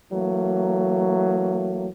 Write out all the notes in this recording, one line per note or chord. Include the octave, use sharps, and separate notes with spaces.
E3 F#3 A3 A#3